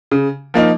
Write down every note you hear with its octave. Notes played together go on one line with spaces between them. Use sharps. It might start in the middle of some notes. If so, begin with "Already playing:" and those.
C#3
F3 A#3 D#4